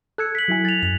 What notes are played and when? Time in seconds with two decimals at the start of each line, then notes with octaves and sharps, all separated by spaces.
0.18 A4 E6 F#6 G#6 C#7
0.35 B6 F#7
0.48 F#3 E4 G#5
0.65 A6 F7
0.83 F#2 F7